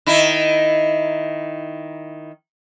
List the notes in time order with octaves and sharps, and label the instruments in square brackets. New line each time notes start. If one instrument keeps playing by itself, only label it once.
[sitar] D#3 E4